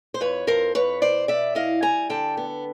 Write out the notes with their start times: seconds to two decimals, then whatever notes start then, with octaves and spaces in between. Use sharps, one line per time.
0.14 C5
0.21 F2 B4 C#5
0.47 F2 A#4 C5
0.75 F2 B4 C#5
1.02 B2 C5 D5
1.28 B2 D5 E5
1.55 E4 D#5 F5
1.82 G3 G#5 A#5
2.10 D3 G5 A5
2.37 B3